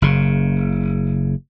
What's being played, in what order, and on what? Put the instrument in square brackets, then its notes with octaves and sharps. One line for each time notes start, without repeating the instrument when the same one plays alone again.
[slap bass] F#1 C#3